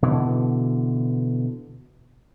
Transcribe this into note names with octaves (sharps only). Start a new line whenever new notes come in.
B2 D3 E3